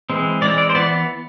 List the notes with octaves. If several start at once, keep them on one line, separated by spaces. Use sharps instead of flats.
E3 G#3 C4
E3 G#3 C4 D5
D5
C5
E3 B3 D5